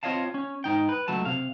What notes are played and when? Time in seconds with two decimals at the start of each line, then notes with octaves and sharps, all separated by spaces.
0.03 C4 F4 C#5 D#5 F5 A5
0.34 C#4
0.64 G#2 D#4 G5
0.89 B4
1.08 C#2 F#3 A3 A5
1.25 C3 F5